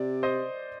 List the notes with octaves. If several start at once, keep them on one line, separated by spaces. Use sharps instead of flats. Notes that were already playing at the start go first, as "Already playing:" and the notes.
Already playing: C3 D5
C5 D#5